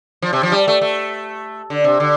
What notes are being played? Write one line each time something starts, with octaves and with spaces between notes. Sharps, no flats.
F3
C3
F3
G3
A3
A3
D3
C3
D3